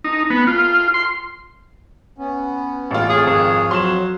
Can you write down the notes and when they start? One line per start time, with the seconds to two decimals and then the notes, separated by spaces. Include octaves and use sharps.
0.04 D#4
0.30 B3
0.47 F4
0.94 C6
2.17 B3 C#4
2.91 A1 F4
3.09 F2 G#4 C#5 F5
3.27 G#1 G#4
3.71 F#3 C6 E7